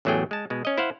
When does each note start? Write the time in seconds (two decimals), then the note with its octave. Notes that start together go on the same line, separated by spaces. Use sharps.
0.05 A1 E2 F#3 A3 G#4 G5
0.31 G#3 A5
0.50 B2 G#3
0.65 C#4 D#5
0.77 E4 C5 F5 F#5